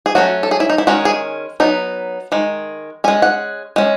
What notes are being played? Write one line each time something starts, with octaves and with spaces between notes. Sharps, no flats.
G#4
F#3 A3 C#4 F#4
A4
G#4
E4
D#4
E4
D#3 G#3 C#4 F#4
G#4
F#3 B3 D#4
D#3 G#3
G#3 C#4 G#5
F#5
G#3 C#4